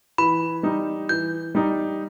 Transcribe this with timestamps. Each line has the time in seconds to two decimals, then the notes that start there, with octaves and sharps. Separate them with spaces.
0.18 E3 B5
0.63 G3 D#4
1.09 E3 G6
1.55 G3 D#4